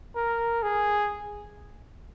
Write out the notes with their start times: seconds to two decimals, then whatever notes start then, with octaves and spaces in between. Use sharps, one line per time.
0.15 A#4
0.63 G#4